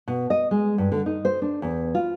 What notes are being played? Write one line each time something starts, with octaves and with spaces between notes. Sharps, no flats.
B2
D#5
G#3
G2
D3
D#4
C5
D4
E2
F4